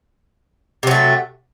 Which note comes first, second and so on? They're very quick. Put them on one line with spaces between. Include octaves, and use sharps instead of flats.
C3 F#3 A3